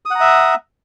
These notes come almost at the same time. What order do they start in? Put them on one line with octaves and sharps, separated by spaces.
D#6 F#5 A#5 E5